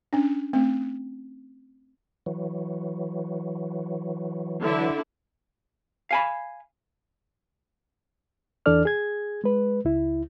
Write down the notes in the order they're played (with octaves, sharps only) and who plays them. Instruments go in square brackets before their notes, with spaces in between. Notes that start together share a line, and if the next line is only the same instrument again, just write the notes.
[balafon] C#4 D4
A3 C4
[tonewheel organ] E3 F#3
[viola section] D3 E4
[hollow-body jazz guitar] F5 G#5 B5
[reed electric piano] E2 E3 D4 A4 D5 F6
G#4 G#6
G#3 B4
C#2 E4